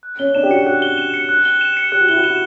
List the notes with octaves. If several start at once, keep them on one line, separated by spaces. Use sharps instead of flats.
F#6
C#4 G7
C#4
D4 E7
G4
F#4 C#7
G4 F#6
G7
E7
C#7
F#6
G7
E7
C#7
G4 F#6
F#4
E4 G7
F#4
E7